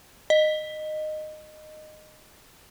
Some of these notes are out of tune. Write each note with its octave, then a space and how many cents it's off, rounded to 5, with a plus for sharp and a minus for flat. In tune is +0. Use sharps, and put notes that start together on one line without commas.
D#5 -15